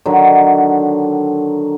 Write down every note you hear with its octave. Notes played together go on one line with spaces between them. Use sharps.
D3 D#3 F#3